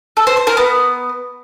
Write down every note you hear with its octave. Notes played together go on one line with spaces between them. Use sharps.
A4
C5
C5
A#4
B3